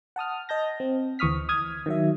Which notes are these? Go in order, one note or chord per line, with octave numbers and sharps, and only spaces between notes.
F#5 A5 D#6 F6
D#5 A5 G6 A#6
C4
D2 E3 C#6 D#6 F6 B6
D#6 F6 G#6
D#3 F#3 E5